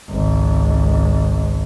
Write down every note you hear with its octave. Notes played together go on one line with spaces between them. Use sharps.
G#1 C#2